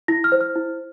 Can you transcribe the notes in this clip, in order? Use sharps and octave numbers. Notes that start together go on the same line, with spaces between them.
E4 A#6
F6
C5
F6
E4